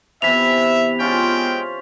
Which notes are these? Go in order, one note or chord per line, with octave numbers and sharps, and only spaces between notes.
C3 E3 B3 E5 B5 B6 F7
G#3 C4 C#4 F4 C5 G5